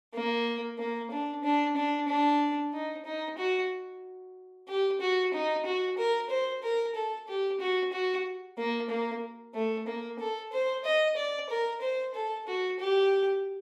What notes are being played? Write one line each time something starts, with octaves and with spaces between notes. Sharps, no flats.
A#3
A#3
D4
D4
D4
D4
D#4
D#4
F#4
G4
F#4
D#4
F#4
A#4
C5
A#4
A4
G4
F#4
F#4
A#3
A#3
A3
A#3
A4
C5
D#5
D5
A#4
C5
A4
F#4
G4